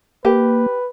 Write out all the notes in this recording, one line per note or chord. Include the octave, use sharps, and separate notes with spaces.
A#3 G4 B4